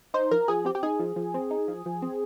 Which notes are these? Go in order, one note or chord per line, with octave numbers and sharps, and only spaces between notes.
D#4 C5
F3 A#4
F3 G#4
C4 G4
G4
D#4 G#4
F3
F3
C4
D#4
F3
F3
C4